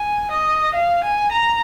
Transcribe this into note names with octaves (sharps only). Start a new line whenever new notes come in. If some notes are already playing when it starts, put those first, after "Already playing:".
Already playing: G#5
D#5
F5
G#5
A#5